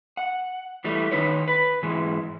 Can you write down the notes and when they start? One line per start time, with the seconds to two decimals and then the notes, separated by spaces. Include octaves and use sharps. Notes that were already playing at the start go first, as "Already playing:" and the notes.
0.17 F#5
0.84 E3 G3 A3
1.11 D#3 D#4 B4 C#5
1.48 B4
1.83 G#2 E3 G#3